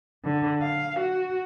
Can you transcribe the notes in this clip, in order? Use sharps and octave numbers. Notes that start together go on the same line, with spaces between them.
D3
F5
F#4